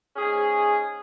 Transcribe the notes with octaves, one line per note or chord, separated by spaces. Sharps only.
G#2 C#4 G#4